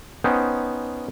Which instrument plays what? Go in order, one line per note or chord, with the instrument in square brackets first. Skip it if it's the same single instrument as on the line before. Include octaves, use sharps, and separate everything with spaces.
[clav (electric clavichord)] B3 C#4 D#4 C5 G5